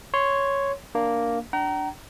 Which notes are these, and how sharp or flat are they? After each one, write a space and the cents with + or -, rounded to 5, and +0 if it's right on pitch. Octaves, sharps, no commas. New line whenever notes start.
C#5 +0 C6 +0
A#3 +0 D4 +0
D4 +0 G5 -45 A#5 +0